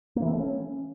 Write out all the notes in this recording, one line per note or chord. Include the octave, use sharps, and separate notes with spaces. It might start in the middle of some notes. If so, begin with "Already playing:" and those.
A#3
E3
C4
A3
C#4